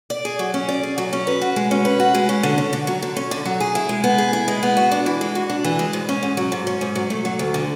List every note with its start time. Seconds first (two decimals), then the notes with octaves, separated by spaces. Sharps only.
0.10 D5
0.25 G#4
0.39 F#3
0.54 C#4
0.69 D5
0.83 G#4
0.98 F#3
1.13 C#4
1.27 B4
1.41 F#4
1.56 G#3
1.71 C#4
1.85 B4
2.00 F#4
2.14 G#3
2.29 C#4
2.43 D3
2.58 C#4
2.73 D3
2.87 F#3
3.02 D3
3.16 C#4
3.31 D3
3.45 F#3
3.60 G#4
3.75 E4
3.89 G#3
4.04 B3
4.18 G#4
4.33 E4
4.48 G#3
4.63 B3
4.77 F#4
4.91 D4
5.06 E3
5.21 G#3
5.35 F#4
5.50 D4
5.64 E3
5.79 G#3
5.93 G#2
6.09 C#4
6.23 G#2
6.37 F#3
6.52 G#2
6.67 C#4
6.81 G#2
6.95 F#3
7.10 A3
7.25 F#3
7.39 D2
7.54 D3